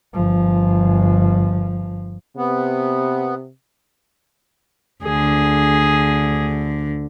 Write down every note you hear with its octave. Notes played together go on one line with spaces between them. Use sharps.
G1 F3
C3 B3
D2 D3 G#4